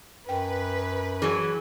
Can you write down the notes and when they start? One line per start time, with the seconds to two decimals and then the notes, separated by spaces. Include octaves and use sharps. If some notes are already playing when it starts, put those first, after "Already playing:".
0.29 F#2 B4 G5
1.22 E3 F#3 G#4